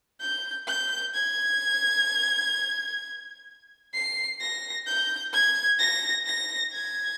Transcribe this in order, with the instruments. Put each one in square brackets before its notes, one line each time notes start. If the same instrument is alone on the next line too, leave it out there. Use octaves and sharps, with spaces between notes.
[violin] G6
G6
G#6
C7
A#6
G6
G#6
A#6
A#6
G#6